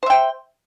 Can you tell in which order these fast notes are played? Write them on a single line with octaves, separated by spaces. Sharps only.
C5 E5 G5